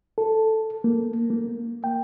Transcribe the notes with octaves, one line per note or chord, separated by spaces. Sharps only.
A4
A#3
A#3
G5